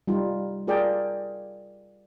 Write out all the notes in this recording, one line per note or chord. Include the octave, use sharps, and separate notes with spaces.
G3 D#4 F4
F4 G#4 A#4 D5 G5